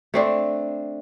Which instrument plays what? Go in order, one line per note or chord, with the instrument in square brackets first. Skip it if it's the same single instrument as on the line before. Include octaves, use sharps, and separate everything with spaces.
[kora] A3 C4 D4